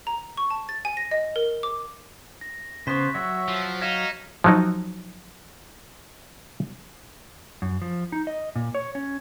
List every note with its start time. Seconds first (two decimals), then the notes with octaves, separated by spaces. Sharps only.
0.07 A#5
0.37 C#6
0.50 A5
0.69 A6
0.85 G#5
0.97 A#6
1.11 D#5
1.36 A#4
1.63 D6
2.41 A#6
2.87 C#3 B3 C5 C#6 F#6 B6
3.14 F#3 F#4 C#5 E5
3.48 F3
3.82 D#4 F5 G#6 B6 E7
4.44 F3 F#3 D#4
7.62 F#2
7.82 F3
8.12 D#4
8.27 D#5
8.56 A#2
8.75 C#5
8.95 C#4